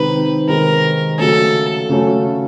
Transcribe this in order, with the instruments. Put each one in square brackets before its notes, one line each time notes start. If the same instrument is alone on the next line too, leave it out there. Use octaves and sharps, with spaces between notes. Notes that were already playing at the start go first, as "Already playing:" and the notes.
Already playing: [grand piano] C3 D#3 G#3 C4 D#4 [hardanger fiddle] B4
[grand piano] C3 D#3 G#3 C4 D#4 [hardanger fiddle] A#4
[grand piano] C#3 F#3 A3 C#4 [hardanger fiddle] A4
[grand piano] C#3 F#3 A3 C#4